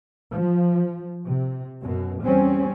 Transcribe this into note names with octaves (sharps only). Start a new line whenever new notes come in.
F3
C3
F#2 B2
E2 G3 C4 C#4